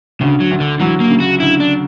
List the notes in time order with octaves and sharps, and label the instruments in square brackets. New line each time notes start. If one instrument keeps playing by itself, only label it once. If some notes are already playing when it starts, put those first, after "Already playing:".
[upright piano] D2 [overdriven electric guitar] C#3
[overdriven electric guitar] F#3
[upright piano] D2
[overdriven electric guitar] D3
[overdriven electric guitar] E3 [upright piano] F#3
[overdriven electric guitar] A#3
[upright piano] C#3
[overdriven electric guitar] F#4
[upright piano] D2 [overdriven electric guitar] E4
[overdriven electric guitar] D4